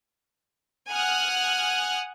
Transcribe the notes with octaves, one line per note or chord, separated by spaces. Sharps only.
F#5 G#5 D#6 F6 F#6